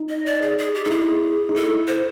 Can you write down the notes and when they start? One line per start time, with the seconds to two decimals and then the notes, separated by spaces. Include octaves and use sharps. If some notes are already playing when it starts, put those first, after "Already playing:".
Already playing: D#4
0.09 D#5
0.26 D5
0.42 G#4
0.58 G#4
0.74 G4
0.84 D#4 A4
0.90 E4 G#4
1.49 D#4
1.55 E4 A4
1.88 C5